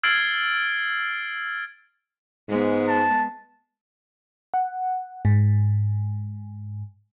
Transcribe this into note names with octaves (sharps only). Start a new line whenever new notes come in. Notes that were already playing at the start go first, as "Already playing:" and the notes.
E6 F6 G#6 A6 C7 D7
G#2 G#3 B3
A5
F#5
G#2